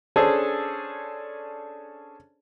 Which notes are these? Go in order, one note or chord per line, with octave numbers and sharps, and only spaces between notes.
C#4 D4 G#4 A4 C5